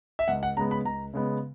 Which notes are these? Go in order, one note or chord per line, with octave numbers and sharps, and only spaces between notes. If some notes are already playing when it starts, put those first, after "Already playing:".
E5
C#2 F#5
F#5
C#3 G#3 B3 A#5
B5
C#2 A#5
C#3 G#3 B3